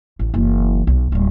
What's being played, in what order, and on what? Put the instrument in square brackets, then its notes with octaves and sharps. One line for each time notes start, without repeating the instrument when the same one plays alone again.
[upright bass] A1
F#1 E3
B1
D1 G3